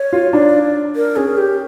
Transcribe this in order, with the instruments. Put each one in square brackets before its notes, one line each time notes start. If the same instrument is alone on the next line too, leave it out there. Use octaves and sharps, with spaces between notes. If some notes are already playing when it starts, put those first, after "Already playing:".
Already playing: [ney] C#5
[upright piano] F4
[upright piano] D4 [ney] D5
[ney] A#4
[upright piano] C#4 [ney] G#4
[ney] G4